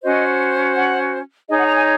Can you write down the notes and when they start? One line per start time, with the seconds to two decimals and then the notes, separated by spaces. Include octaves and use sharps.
0.02 C#4 F#4 C5 D#5
0.76 F#5
1.49 D#4 G#4 C#5 D#5
1.58 F#5
1.67 A#5
1.77 G#5